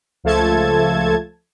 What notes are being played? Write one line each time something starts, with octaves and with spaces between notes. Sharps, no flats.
C#2 F3 A3 A4 A5 G#6